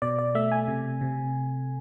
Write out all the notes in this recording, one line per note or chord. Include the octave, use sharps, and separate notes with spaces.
B2 D5
D5
A3 E5
G#5
C3
C3